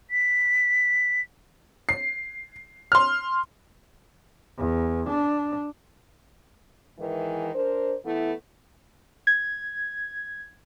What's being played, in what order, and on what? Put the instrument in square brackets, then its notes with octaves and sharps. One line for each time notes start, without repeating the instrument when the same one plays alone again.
[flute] B6
[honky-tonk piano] C7
C6 F6
[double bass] E2
D4
[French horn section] G#2 D#3 E3
D4 A#4 C5
E3 A3 B3 E4
[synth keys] G#6